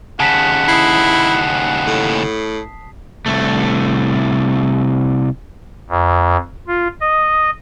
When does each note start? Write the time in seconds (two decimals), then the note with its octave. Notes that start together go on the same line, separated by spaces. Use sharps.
0.20 D#2 C#3 F#5 A5 B6 E7
0.68 E4 D#6 C7
1.87 A2
3.26 C2 A3
5.90 F2
6.67 F4
7.01 D#5